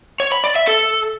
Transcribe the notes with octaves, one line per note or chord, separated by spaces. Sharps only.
C#5
B5
D5
E5
A4